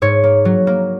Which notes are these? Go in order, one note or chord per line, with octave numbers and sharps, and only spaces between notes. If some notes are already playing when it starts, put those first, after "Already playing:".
G#2 C#5
A#3
F#3
A#3